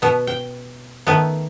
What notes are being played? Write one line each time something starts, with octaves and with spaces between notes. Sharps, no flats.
B2 B3
G5
D#3 A3 B3